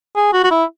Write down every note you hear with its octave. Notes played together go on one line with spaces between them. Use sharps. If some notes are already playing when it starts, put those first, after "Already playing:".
G#4
F#4
F#4
E4